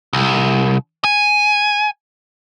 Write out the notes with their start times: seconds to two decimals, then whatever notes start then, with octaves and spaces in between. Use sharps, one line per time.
0.13 C2
1.04 G#5